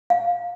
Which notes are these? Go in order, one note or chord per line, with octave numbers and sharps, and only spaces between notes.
F5